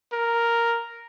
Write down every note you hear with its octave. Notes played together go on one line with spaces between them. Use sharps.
A#4